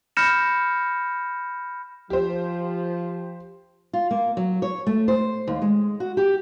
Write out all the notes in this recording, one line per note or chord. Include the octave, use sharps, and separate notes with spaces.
B5 F6 G6 A#6 C#7 E7
F3 G4 C5
F4
A#3
F#3
C#5
A3
C5
D#2
G#3
F#4
G4